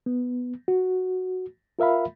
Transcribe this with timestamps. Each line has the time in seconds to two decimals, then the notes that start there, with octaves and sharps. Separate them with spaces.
0.06 B3
0.68 F#4
1.79 F4 A#4 E5 F5 B5